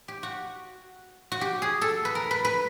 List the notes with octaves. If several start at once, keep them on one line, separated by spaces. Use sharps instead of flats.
G4
F#4
F#4
G4
G#4
A4
B4
A#4
B4
B4